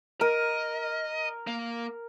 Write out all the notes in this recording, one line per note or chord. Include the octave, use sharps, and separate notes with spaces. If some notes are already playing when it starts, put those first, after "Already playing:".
A#4 D#5
A#3